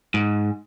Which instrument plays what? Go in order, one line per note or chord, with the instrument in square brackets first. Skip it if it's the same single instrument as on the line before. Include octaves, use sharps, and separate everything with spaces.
[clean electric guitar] G#2